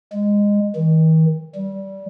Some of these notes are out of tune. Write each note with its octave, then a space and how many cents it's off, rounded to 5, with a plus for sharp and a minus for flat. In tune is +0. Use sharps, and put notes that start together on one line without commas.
G#3 -20
D#3 +45
G3 -20